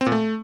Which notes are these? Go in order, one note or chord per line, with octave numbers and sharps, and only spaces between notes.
C4
A#2
A3